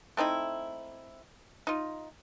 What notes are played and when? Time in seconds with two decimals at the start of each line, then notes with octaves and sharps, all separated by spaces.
0.17 A3 C4 D#4 E4
1.67 D#4 F4